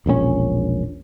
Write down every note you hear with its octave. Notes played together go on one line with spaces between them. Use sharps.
E1 A#1 G#2 C#4